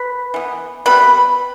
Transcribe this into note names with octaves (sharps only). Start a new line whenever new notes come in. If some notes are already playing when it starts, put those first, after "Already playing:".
Already playing: B4 B5
E3 B3
C3 G3 B3 B4 B5